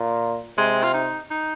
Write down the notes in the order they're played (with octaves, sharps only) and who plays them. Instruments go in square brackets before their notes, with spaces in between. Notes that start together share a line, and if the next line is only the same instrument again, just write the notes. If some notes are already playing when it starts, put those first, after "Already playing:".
Already playing: [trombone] A#2
[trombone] C3 [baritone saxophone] G#3
[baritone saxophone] F4
D#4
D#4